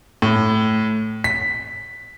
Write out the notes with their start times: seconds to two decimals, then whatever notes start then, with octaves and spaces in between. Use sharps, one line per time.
0.22 A2
1.24 B6